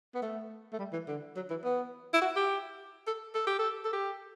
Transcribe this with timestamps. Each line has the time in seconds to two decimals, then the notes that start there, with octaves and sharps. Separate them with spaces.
0.15 B3
0.22 A3
0.73 A3
0.79 G3
0.93 E3
1.08 D3
1.36 F#3
1.50 E3
1.64 B3
2.14 E4
2.22 F#4
2.36 G4
3.07 A4
3.34 A4
3.47 G4
3.59 A4
3.85 A4
3.93 G4